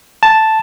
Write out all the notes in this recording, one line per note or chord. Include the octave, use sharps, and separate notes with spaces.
A5